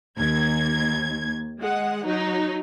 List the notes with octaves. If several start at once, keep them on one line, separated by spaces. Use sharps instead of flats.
D#2 G#6
G#3 F#5
F#3 D#4